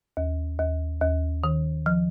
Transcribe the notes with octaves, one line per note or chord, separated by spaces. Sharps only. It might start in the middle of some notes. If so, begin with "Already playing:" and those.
D#2
D#2
D#2
D#3
F3